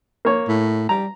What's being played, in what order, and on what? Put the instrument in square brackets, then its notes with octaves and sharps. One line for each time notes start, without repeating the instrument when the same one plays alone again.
[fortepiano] A#3 C#5
[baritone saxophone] A2
[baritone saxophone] G3 [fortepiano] A#5